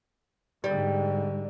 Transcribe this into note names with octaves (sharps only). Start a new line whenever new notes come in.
G#2 D3 G3